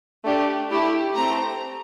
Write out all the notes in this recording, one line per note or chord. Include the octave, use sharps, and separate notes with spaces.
A3 D4 G4
A3 E4 G4
A3 C4 G4 A#5